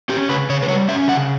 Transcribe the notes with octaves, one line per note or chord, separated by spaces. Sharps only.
C#4 G4
C#3 B4
C#3 C#5
B4
G3 C#5
C#4 E5
C#3 F#5